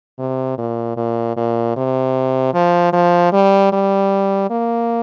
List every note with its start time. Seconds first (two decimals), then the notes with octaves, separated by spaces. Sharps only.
0.19 C3
0.58 A#2
0.97 A#2
1.37 A#2
1.77 C3
2.54 F3
2.93 F3
3.33 G3
3.73 G3
4.51 A#3